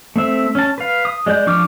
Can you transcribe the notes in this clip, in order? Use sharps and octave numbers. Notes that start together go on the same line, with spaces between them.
A3 C4 E5
C#4 A5
B4 F5
D#6
G#3 D5 D#5 G6
F3 D4 C#6 D6 F6